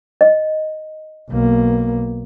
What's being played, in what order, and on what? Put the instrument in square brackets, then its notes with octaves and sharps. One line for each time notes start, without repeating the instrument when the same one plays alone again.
[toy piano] D#5
[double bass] B1 A#3